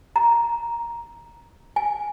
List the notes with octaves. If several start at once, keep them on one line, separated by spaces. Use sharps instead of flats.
A#5
G#5